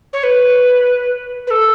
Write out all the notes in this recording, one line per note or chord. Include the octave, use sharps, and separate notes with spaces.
C#5
B4
B4
A4